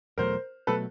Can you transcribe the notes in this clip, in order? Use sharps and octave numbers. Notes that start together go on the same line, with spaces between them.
E2 B2 F#3 A3 A#4 C5
B2 F#3 A3 A4 B4